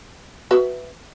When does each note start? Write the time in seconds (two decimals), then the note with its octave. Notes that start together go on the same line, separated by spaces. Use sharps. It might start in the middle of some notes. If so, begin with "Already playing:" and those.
0.51 F#4 B4 E5